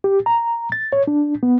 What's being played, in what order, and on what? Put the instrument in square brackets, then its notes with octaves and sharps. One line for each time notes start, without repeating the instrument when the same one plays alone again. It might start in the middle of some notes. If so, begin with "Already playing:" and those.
[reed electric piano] G4
A#5
A6
C#5
D4
B3